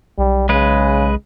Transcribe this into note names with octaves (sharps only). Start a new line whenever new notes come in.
B1 G3
C#3 G#3 B4